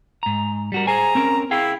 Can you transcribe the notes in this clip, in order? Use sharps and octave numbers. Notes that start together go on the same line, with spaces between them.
G#2 A#5
G3 F#4 A#4
G#4 C5 G#5 A#5
C4 C#4 A#4
E4 G#4 F5 G5